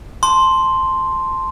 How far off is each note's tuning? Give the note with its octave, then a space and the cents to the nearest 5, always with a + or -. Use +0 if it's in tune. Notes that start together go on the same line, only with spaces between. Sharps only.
A5 +0 C6 +0